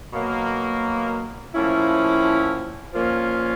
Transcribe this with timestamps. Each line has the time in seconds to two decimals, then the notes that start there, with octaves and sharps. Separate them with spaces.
0.13 B2 F#3 A#3
1.54 A2 F3 A#3 C#4 E4
2.94 A#2 F3 A#3 C#4 F4